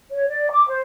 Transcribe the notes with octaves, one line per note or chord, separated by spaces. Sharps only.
C#5
D5
D6
C5